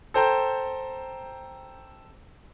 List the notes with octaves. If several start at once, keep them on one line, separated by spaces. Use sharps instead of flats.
A4 C5 G5 A#5